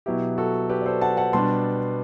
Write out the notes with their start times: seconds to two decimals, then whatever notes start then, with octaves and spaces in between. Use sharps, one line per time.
0.06 B2 F#3 B3 E4 G4
0.38 F#4 A4
0.69 G4 B4
0.81 D5
0.86 A4 C5
1.01 F#5 A5
1.17 F#5 A5
1.33 B2 G3 B3 D4 A5 C6